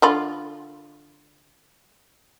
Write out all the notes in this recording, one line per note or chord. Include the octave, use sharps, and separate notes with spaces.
D3 F4 B5